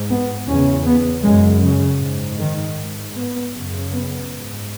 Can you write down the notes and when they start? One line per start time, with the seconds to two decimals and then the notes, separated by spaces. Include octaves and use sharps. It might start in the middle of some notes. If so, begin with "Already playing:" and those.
Already playing: G#2
0.10 B3
0.47 E2 C#3 C#4
0.85 B3
1.23 F#2 C#3 G#3
1.62 C#3
2.01 G#2
2.39 D#3
2.77 G#2
3.16 B3
3.53 F#2 C#3
3.92 B3
4.30 G#2